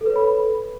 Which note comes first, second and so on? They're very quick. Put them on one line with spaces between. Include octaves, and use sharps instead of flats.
A4 B4 C#5 B5